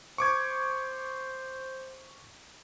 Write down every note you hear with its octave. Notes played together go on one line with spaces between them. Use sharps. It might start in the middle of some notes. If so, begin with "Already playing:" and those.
C5 C#6 D6 G#6